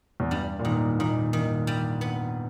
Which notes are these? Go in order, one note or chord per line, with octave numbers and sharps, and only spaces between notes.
E2
G2 G3
A#2
G#2 D#3
A#2 D#3
D#3
G3
B3